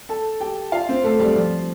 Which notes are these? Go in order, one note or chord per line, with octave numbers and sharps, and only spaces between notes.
A4 A5
G4 G5
F4 F5
C4 C5
A3 A4
G3 G4
F3 F4